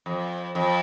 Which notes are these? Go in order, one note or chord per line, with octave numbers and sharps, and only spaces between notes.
F2
F2